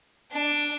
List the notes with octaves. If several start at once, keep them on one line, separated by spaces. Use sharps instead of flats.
D4